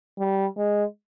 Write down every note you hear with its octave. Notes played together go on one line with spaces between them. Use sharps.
G3
G#3